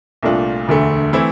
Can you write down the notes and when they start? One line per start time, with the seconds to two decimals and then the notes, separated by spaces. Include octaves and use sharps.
0.23 C2 A#2 A3 D4 F4
0.68 E1 D2 D3 A3
1.13 E3 A3 C4 E4